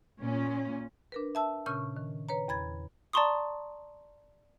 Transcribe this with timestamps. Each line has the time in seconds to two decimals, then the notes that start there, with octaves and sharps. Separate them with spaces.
0.21 A#2 C#4
1.12 D4 A#4 B4
1.35 E5 A5 E6
1.66 A#2 C#3 C#4 C#6 F6 G6
1.97 D#3
2.29 B4 C#5 A#5
2.48 E2 B5 G#6 A6
3.13 D5 A5 A#5 C6 C#6 D#6